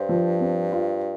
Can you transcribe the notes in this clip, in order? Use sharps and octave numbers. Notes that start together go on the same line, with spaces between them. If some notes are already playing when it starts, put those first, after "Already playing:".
Already playing: G2 C5
F3
C4
F4